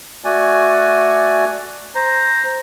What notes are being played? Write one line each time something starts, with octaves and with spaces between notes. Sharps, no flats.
A3 F#4 D5 G#5
C5 A#5